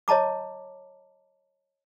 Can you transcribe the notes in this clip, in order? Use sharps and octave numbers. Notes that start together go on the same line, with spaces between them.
C#5 D#5 A5 A#5 D6